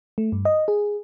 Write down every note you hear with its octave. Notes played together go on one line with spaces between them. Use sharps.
A3
G2
D#5
G#4